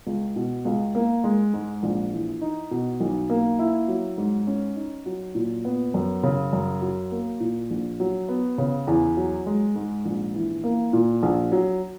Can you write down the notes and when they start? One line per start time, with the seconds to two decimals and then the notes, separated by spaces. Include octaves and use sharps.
0.07 C#2
0.36 B2
0.65 C#2
0.95 A#3
1.24 G#3
1.54 G#2
1.83 A#1
2.12 E3
2.41 D#4
2.71 B2
3.00 B1
3.30 A#3
3.59 E4
3.88 F#3
4.18 G#2
4.47 C#4
4.76 D#4
5.06 F#3
5.35 A#2
5.65 B3
5.94 F#2
6.23 C#3
6.53 F#2
6.81 F#3
7.11 A#3
7.40 A#2
7.70 A#1
8.00 F#3
8.29 B3
8.58 C#3
8.87 E2
9.17 F#3
9.46 G#3
9.76 G#2
10.05 A#1
10.34 E3
10.64 A#3
10.93 A#2
11.23 A#1
11.52 F#3